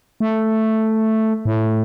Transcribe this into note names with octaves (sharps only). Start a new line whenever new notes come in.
A3
A2